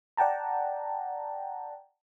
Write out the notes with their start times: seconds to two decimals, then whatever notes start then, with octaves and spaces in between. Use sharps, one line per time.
0.17 D5 F#5 G5 A5 A#5